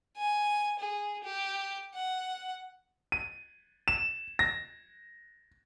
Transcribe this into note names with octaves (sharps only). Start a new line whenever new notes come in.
G#5
G#4
G4
F#5
D#7
E7
A#6